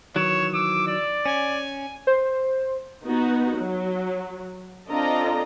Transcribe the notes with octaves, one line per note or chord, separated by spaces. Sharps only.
D#3 E3 F#3 C#5 E7
D6 E6
D5
C#4 G#5
C5
B3 D#4 F#4
F#3
C4 D4 F4 A4 D#5 A#5